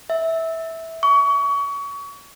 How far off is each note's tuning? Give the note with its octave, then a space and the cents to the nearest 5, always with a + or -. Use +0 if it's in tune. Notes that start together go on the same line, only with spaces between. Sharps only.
E5 -15
C#6 +30